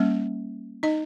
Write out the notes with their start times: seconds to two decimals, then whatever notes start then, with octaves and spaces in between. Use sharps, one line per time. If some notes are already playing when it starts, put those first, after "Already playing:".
Already playing: G3 A#3 C#4
0.83 D#4 D#5